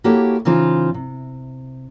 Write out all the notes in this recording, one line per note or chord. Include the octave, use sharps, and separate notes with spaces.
A#3 E4 F#4 G4 A4 C#5
C#3 E3 D#4 F4 C5
C3